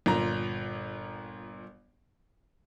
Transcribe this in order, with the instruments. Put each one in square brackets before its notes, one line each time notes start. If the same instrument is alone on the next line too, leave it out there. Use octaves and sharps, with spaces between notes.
[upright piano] G1 A#2 A#5